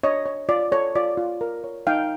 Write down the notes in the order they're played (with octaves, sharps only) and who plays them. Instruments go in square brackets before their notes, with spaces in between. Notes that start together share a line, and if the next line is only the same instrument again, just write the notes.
[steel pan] D4 C#5 D#5
C#5
F4 D5
A4 C#5
F4 D5
F4
A#4
C#5
D#4 F5 G5